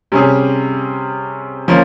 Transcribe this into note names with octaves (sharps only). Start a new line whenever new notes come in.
C3 G3 C#4 G#4
F3 A#3 C#4